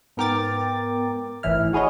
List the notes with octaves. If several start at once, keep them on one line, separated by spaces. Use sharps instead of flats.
G#2 B3 A#4 G5 D6 A6
G#1 A2 E3 E4 F6
F#4 G#4 B4 C#5 D#5